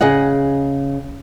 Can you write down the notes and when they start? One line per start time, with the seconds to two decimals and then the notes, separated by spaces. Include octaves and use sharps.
0.01 C#3 G#4 D#5 F#5